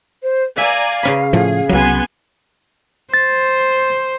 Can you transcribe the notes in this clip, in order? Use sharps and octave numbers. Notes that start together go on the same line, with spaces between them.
C5
D5 E5 F5 G#5 A#5
C#3 C#4 B5
A2 F3 G#4
C2 F#3 B3 G#5 C6
C5 A6